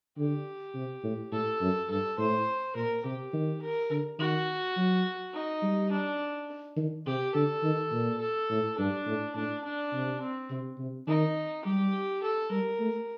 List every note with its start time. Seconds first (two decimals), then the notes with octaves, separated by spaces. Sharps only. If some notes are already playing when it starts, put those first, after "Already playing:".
0.18 D3 G4
0.75 C3
1.04 A2
1.32 A2 A4
1.61 F#2
1.90 G2 A4
2.18 A2 C5
2.75 A#2 A#4
3.04 C3 G4
3.33 D#3
3.62 A#4
3.91 D3
4.19 D#3 F#4
4.76 F#3
5.34 D#4
5.63 G3
5.91 D4
6.77 D#3
7.06 C3 G4
7.35 D3 A4
7.63 D#3
7.92 A#2
8.21 A4
8.50 A2
8.78 G2 D4
9.07 A2
9.35 A2 D4
9.64 D4
9.93 C3
10.21 C4
10.50 C3
10.78 C3
11.07 D#3 D#4
11.65 G3 G4
12.22 A4
12.51 G3 A#4
12.80 A3